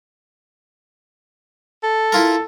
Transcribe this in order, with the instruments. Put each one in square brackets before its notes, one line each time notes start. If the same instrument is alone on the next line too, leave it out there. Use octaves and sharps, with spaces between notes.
[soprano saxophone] A4
[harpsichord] E4 F4 A#4